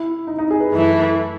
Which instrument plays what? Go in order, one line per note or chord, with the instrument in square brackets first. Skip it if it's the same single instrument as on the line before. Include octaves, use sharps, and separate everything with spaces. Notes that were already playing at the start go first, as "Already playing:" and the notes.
Already playing: [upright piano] E4
D#4
D#4
G#4
B4
[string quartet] F#2 E3 A3 E4